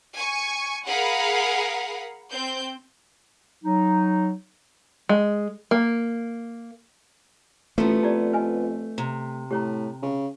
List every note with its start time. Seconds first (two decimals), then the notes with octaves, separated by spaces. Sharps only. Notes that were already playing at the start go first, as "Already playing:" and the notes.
0.14 G#5 C#6
0.87 G#4 A#4 F5 F#5 B5
2.31 C4 G6
3.64 F#3 D#4
5.09 G#3
5.71 A#3
7.78 A1 F3 A3 B3
8.03 F2 E4 G4 D5
8.33 B4 D#5 G#5
8.98 C3 A#5
9.51 A2 G4 C#5 A#5
10.03 C#3